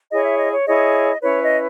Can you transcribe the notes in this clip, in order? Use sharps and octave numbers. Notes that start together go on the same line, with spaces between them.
E4 G#4 C#5 D#5
E5
D#5
C#5
E4 G#4 C#5 D#5
C#4 E4 B4 C#5
D#5